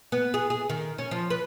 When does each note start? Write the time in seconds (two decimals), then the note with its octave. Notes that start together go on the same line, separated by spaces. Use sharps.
0.12 B3
0.34 G#4
0.50 G#4
0.70 D#3
0.98 C#4
1.11 F3
1.30 B4